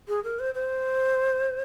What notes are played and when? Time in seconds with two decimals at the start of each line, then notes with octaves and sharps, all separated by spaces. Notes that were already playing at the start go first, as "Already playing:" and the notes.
0.08 G#4
0.24 A#4
0.39 C5
0.55 C5